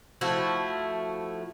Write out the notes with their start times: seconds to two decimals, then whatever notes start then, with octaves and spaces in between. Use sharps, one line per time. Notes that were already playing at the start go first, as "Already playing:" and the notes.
0.21 F3 A3 E4 F#4